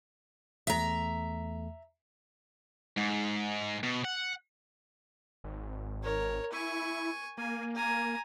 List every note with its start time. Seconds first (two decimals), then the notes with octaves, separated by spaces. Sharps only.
0.67 E2 A3 E5 A#5
2.98 G#2
3.83 B2
4.05 F#5
5.44 G#1
6.03 A#4 C#5
6.52 E4 G#5 C#6
7.38 A#3 G#5
7.75 G#5 A#5